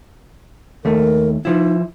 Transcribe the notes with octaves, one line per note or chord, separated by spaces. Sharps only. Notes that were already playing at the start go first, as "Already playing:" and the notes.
D#2 A3 A#4
F3 D#4 E4